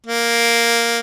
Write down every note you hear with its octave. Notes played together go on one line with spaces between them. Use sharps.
A#3